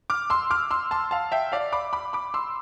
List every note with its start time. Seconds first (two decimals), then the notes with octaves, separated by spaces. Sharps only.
0.10 D6 F6
0.30 C6 E6
0.50 D6 F6
0.71 C6 E6
0.91 A5 C6
1.11 F5 A5
1.32 E5 G5
1.52 D5 F5
1.73 B5 D6
1.93 B5 D6
2.13 B5 D6
2.34 C6 E6